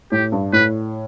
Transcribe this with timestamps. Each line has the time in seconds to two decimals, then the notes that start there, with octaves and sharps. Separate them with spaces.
0.12 A2 G4
0.32 G2
0.53 A2 B4